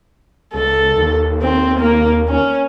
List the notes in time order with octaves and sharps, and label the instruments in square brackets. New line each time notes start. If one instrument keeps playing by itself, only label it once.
[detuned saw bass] C#2 [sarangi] A4
[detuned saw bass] D#2
[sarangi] C4
A#3
C#4